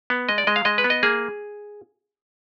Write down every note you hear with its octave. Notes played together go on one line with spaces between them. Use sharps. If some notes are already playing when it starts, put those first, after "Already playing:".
B3
G#3 D#5
D5
G#3 D#5
F5
G#3 D#5
B4
B3
D#5
A#3 G#4